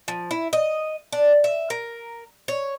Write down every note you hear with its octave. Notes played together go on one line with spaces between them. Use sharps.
F3
E4
D#5
D4
E5
A#4
C#5